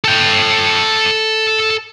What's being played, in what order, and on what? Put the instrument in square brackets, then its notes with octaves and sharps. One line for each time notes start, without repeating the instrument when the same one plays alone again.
[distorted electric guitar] A4 G5